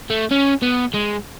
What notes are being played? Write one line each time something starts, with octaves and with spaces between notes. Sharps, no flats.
A3
C#4
B3
G#3